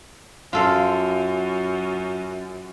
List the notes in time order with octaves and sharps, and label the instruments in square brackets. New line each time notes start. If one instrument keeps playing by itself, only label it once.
[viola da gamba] F#2 [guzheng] F4 A4 F5